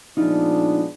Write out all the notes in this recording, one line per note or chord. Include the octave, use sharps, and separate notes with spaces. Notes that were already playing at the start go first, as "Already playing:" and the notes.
A#2 F3 G#3 B3 D4 D#4 F4